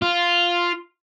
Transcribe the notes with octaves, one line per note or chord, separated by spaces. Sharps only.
F4